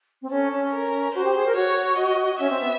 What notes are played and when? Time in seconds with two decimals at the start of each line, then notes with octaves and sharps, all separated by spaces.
0.22 C4
0.30 C#4 A4
0.52 C#4
0.73 A#4
1.14 F#4 C5
1.25 G4
1.35 G#4
1.46 A#4
1.55 F#4 C#5
1.98 D#5
2.39 C#4 E5
2.50 C4
2.61 B3